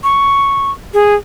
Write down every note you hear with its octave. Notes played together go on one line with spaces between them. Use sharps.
C#6
G#4